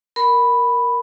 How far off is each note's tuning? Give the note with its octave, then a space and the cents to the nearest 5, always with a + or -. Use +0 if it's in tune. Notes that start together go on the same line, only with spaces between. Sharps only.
A#4 +0 B5 +0